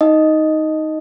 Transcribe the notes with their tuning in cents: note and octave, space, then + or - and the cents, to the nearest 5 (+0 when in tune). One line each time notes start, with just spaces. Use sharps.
D#4 +10 D#5 +0